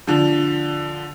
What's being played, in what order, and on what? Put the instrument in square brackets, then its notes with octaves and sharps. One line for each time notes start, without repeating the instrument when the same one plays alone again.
[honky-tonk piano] D3 F3